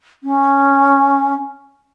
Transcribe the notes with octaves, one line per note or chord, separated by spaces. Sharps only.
C#4